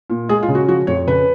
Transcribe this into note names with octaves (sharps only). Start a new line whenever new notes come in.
A#2
G#3 G#4
F4
C#3
F#4
F3 F#4
F2 C#5
C#3 B4